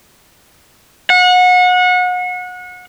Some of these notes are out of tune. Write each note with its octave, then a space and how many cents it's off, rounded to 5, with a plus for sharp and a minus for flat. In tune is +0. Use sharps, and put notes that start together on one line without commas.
F#5 -30